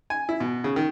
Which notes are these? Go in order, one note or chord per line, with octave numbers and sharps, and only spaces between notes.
G#5
E4
B2
C#3
D#3